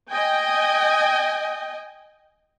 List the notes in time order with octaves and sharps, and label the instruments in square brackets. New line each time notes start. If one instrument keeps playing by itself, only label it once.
[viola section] D#5 G5 G#5